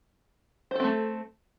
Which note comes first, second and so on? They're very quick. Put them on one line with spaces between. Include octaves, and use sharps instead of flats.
C5 A4 C4 A3